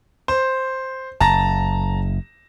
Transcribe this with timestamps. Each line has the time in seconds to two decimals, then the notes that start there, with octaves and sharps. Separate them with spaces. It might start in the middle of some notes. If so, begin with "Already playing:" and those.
0.28 C5
1.21 F#1 A5 A#5 A#6